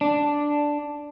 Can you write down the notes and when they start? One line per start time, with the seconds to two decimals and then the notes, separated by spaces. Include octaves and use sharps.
0.01 D4